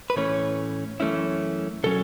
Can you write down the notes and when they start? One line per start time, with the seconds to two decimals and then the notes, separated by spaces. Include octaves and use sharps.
0.10 B4
0.16 A2 E3 A3 C#4 C#5
1.00 F#2 E3 A3 C#4 E4
1.84 B2 F#3 C#4 A4